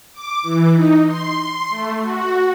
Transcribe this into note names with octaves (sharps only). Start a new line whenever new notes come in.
D6
E3
D#4
C6
A3
F#4